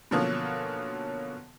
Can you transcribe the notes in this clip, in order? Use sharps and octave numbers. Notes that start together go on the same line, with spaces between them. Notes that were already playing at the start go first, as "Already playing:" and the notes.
B2 D3 F3 F#3 A#3 C#4